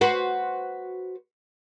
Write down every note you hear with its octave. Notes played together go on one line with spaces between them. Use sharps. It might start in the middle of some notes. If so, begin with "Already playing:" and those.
F#4 B4 C5